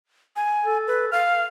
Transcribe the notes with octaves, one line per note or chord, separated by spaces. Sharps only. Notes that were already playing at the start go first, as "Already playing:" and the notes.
G#5
A4
B4
F5 F6